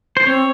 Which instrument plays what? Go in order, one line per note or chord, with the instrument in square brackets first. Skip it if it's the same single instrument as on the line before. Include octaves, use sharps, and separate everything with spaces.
[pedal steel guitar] C5
[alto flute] C4 [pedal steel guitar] C#5